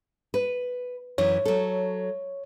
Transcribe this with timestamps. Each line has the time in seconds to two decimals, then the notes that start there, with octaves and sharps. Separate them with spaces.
0.34 B4
1.18 F#2 E3 C#5
1.45 F#3 A4